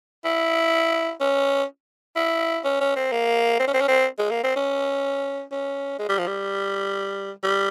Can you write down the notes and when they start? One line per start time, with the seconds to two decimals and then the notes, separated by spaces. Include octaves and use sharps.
0.25 E4
1.20 C#4
2.16 E4
2.64 C#4
2.80 C#4
2.96 C4
3.12 A#3
3.59 C4
3.67 C#4
3.74 C4
3.81 C#4
3.88 C4
4.18 G#3
4.31 A#3
4.43 C4
4.56 C#4
5.51 C#4
5.99 G#3
6.09 G3
6.18 F3
6.27 G3
7.43 G3